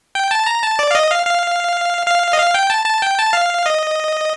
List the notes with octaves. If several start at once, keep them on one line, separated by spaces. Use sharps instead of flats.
G5
A5
A#5
A5
D5
F5
D#5
F5
F5
F5
D#5
F5
G5
A5
A5
G5
A5
F5
D#5